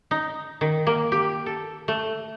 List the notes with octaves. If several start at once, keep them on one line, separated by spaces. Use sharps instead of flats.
D#4
D#3
A#3
G4
A4
A3